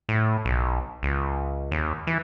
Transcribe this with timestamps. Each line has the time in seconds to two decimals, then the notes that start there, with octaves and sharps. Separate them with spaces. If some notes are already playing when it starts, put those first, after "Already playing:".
0.09 A2
0.45 B1
1.03 C#2
1.71 D#2
2.07 E3